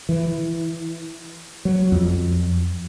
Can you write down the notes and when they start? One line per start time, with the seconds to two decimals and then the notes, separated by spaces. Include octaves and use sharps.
0.09 E3
1.65 F#3
1.92 F2